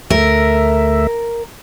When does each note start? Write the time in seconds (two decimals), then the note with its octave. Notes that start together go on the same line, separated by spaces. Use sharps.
0.10 D2 A3 A#4 E5